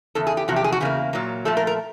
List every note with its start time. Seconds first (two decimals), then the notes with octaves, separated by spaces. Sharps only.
0.15 E2 C#3 A4
0.27 G#4
0.37 G4
0.48 E2 C3 F3 F#4
0.56 G4
0.64 G#4
0.72 F#4
0.80 E2 C#3 A#3 G#4
1.13 A#2 F#3 A#3
1.45 A#2 F3 A3 A4
1.57 A#4
1.67 A#4